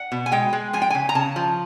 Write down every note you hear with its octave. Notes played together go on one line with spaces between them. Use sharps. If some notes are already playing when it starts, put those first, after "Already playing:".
Already playing: F#5
B2
G#5
G#3 G5
G#3
F3 G#5
G5
C#3 G#5
A#5
C#3 A5
F3